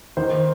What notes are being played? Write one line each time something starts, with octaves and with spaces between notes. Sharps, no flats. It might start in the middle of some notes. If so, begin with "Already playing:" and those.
D#3 C5